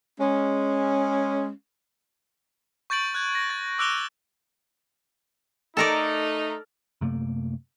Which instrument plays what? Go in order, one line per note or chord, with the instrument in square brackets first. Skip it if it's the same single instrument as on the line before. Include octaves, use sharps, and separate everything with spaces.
[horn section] G#3 C#4
[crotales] C#6 G6 A6 D7 F#7
F#6 G#6
A#6
A6
D6 E6 F#6 D7 F7 G7
[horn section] A3 D#4 [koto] A4 A#4 D5
[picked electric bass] F#2 C3 A3 A#3